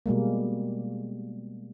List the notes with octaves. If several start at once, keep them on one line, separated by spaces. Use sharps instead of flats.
B2 G3 G#3 A#3